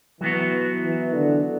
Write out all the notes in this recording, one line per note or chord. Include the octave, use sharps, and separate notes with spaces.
E3 F#3 B3 F#4
E3
D3